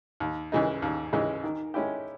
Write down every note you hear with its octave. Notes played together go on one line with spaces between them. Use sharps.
D#2
C#3 E3 G#3 D#4
D#2
C#3 E3 G#3 D#4
D#3
G#3 C#4 E4 G4